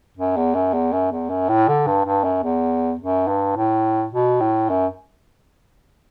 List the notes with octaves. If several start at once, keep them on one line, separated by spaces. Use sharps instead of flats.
F#2
E2
F#2
E2
F#2
E2
F#2
A2
D3
G2
G2
F#2
E2
F#2
G2
A2
B2
A2
F#2